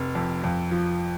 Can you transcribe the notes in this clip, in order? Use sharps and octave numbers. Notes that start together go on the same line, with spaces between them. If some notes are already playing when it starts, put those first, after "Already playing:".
Already playing: F1
F2
F2
F3